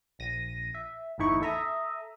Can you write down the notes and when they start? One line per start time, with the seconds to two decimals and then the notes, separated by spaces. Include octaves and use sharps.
0.19 A#1 A#6 D#7
0.74 E5
1.18 G1 E2 A2 D#4 E4 C#6
1.42 A4 E5 A#5 D#6